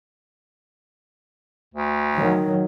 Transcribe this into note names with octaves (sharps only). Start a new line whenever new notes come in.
D2
D#3 F#3